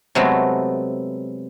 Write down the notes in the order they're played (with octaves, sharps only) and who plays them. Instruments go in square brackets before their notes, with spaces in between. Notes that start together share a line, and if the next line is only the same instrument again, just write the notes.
[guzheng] C3 F#3 G#3 A3 B3